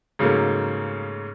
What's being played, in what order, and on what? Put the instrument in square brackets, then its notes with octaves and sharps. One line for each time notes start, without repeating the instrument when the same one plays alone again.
[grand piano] G#2 C#3 F#3 A3 A#3